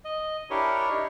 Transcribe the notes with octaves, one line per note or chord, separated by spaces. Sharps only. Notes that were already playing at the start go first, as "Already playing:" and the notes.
D#5
D4 E4 G4 A#4 C#5
D#4